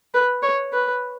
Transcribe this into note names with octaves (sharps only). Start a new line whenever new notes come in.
B4
C#5
B4